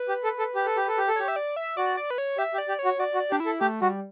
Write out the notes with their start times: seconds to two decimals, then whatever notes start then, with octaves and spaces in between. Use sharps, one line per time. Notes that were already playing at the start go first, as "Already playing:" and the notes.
Already playing: B4
0.09 G4
0.24 A4
0.39 A4
0.55 G4
0.66 A4
0.76 G4
0.88 A4
0.98 G4
1.08 A4
1.16 G4 C#5
1.28 E5
1.36 D5
1.56 E5
1.77 F#4 D5
1.97 D5
2.10 B4
2.18 C#5
2.38 G4 E5
2.54 G4
2.58 D5
2.68 G4
2.79 C#5
2.85 F#4
2.99 F#4 D5
3.14 F#4
3.20 D5
3.31 D4 G4
3.40 E4
3.46 A4
3.60 A3 G4
3.82 G3 F#4